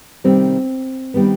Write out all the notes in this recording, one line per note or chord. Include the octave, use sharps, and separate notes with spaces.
C3 D#3 G3 C4
D#3 G3 B3